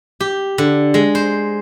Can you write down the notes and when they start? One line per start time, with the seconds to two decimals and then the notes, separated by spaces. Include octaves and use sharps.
0.20 G4
0.58 D3
0.94 G#3
1.15 C5